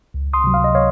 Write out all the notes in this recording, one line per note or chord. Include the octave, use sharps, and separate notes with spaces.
C#2
C6 D#6
C3 F#3
F5
D#5
C#5 F5